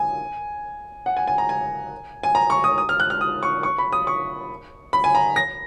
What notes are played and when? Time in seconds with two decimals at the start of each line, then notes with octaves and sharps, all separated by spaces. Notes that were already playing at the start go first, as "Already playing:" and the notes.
Already playing: G#5
1.06 F#5
1.17 G#5
1.27 G#5
1.38 A#5
1.49 G#5
2.23 G#5
2.35 A#5
2.50 C#6
2.64 D#6
2.78 D#6
2.89 F6
3.00 F#6
3.10 F6
3.21 D#6
3.43 C#6
3.63 C#6
3.78 B5
3.92 D#6
4.07 C#6
4.93 B5
5.04 G#5
5.15 A#5
5.36 A#6